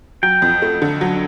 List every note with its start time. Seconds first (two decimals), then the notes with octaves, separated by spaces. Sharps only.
0.23 F#3 G5
0.42 F2
0.62 A3
0.82 D3
1.01 F#3